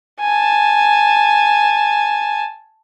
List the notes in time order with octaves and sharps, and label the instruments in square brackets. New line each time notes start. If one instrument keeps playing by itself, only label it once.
[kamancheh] G#5 A5